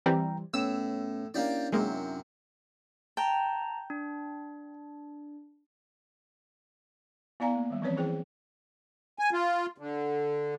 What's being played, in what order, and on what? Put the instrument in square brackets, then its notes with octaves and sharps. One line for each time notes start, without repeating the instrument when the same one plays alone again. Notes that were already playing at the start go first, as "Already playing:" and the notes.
[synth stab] E3 G3 C4 [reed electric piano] G5 A#5
[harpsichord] A2 [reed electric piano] B3 C#4 [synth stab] E6
[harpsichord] A#3 G4 D5 [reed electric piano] C#4 D4 E4
[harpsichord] F#2 C3 [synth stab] G#3 A#3
[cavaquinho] G5 [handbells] A5 A#5
[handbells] D4
[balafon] B3 E4 D5 F5 G#5 A#5
A#3
D#3 G3
E3 F3 C4 C#4 B4 C#5
E3 E4 G#4 C5 G5
[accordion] G#5
F4
D3